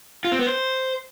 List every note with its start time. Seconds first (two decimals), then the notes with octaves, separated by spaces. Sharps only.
0.25 F4
0.32 C4
0.39 B3
0.47 C5